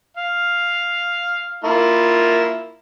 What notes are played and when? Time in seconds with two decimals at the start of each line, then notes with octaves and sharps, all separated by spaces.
0.17 F5
1.64 A#3 E4 F4